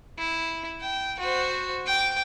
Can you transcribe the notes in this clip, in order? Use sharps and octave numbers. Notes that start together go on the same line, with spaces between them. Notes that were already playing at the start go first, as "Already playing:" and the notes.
E4
G5
F#4 C5
G5 D6